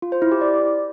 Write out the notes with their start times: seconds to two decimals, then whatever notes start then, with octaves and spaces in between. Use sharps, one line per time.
0.02 F4
0.12 C5
0.22 E4
0.32 G4
0.41 D5